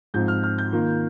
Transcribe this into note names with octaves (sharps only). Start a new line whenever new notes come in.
G#2 F3 C4 F4 G6
F6
F6
G6
D#3 A#3 F4